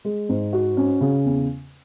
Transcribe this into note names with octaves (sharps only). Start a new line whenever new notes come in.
G#3
G#2
F#4
C#4
C#3
E2